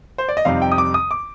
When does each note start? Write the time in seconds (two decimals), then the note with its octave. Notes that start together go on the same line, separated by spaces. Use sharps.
0.18 C5
0.29 D5
0.37 D#5
0.45 F2 C3 G3 C4 D#4 F5
0.62 G5
0.72 D#6
0.78 D6
0.94 D#6
1.11 D6